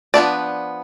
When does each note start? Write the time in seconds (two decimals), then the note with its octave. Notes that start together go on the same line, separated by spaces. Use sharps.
0.14 F3 B3 D4 D5